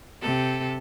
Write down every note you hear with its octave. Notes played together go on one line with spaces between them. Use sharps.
C3 A4